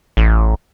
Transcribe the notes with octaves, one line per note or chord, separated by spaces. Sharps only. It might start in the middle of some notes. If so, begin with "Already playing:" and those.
A1